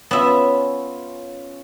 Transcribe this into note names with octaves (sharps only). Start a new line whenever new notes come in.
B3 C#4 F4 E5